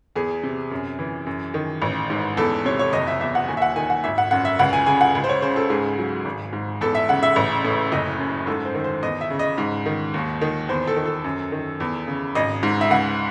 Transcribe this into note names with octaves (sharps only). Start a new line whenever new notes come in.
E2 G#4
C3
F#2
E3
F#2
D#3
A1
G#2
E2 A4
C3 C#5
C#5
F#1 D#5
E5
E2 E5
F#5
D#2 G#5
E5
F#5
D#3 G#5
F#5
G#1 E5
F#5
F#2 F#5
E5
C#2 F#5
G#5
C#3 G#5
F#5
C#2
C5
C#5
C#3 C5
A4
G#2 G#4
F#3
G#1
G#2
E2 A4
E5
C#3 F#5
E5
A1
A2
F#1 D#5
F#2
G#2 A4
C5
D#3
C5
E2 D#5
E5
C#3
D#5
G#2
D#3
D#2
D#3
E2 C5
A4
D#3
A4
F#2
D#3
E2
C#3
G#1 D#5
G#2
E5
C#2 F#5